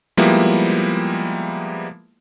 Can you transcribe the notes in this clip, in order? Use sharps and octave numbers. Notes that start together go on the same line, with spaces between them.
F3 G3 G#3 A#3 B3 E4